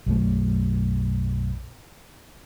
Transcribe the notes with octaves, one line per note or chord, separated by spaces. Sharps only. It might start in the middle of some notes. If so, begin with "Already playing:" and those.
B1 F#2 A3